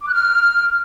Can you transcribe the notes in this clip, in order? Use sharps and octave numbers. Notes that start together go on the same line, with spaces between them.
D6
F#6
F6